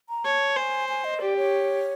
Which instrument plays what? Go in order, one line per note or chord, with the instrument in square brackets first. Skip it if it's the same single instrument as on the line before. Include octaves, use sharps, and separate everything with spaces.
[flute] A#5
[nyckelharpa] C#5 [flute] A5
[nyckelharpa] C5 [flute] G#5
[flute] G#5
D#5
[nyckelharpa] G4 [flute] D5
[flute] C#5